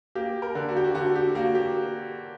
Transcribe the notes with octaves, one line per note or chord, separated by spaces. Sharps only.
A#3 G4
A#4
D3
F#4
G4
F#4
D3 F#4
G4
A#3 F#4
G4